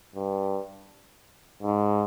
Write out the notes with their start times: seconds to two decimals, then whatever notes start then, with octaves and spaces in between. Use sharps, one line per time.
0.16 G2
1.63 G#2